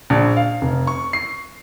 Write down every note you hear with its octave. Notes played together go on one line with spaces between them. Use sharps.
A#1
F5
F1
C#6
C7